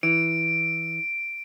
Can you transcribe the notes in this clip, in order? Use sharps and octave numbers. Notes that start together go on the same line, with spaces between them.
E3 D7